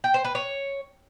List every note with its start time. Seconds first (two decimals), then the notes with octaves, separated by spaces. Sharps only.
0.04 G5
0.14 C5
0.25 B4
0.35 C#5